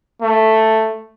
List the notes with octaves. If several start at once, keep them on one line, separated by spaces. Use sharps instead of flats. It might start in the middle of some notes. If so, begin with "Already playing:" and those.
A3